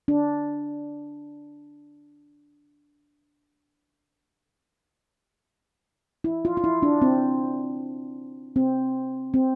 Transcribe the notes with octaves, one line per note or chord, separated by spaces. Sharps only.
D4
E4
F4
F4
E4
D4
C4
C4
C4